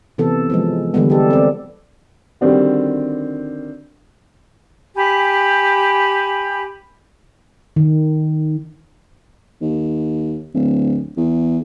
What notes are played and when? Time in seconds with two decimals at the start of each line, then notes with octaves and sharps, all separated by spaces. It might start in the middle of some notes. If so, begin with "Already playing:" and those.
0.18 C3 E3 B3 A4
0.50 E3 F3 G#3
0.94 D3 E3 G3 G#3 B3
1.10 G4 A4
1.31 C4 D5
2.41 D3 D#3 G3 C4 D4 F#4
4.95 G4 G#5 B5
7.76 D#3
9.61 D#2
10.54 D1
11.17 E2